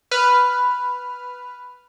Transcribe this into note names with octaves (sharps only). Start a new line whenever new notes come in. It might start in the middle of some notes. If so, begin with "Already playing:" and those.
B4 F6